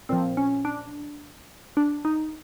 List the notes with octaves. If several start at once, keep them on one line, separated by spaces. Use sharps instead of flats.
A#2 F3 C4
C#4
D4
D4
D#4